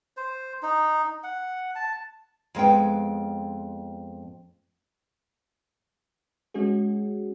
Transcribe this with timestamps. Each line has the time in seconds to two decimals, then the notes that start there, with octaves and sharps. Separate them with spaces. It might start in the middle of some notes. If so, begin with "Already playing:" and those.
0.17 C5
0.63 D#4
1.24 F#5
1.75 A5
2.55 F2 G#3 B3 G5
6.54 G#3 C#4 F#4 G#4